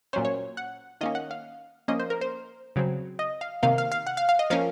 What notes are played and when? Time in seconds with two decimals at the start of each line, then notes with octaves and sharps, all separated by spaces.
0.13 A#2 F#3 C#4 C5
0.25 C#5
0.57 F#5
1.01 D#3 A#3 C#4 D#5
1.15 F#5
1.31 F5
1.88 F3 A#3 C#4 D#5
1.99 C5
2.10 A#4
2.21 C5
2.76 C#3 F#3 C4
3.19 D#5
3.41 F5
3.63 C3 D#3 A#3 F5
3.78 F5
3.92 F5
4.07 F#5
4.17 F5
4.29 F5
4.39 D#5
4.50 F3 A#3 C#4 F5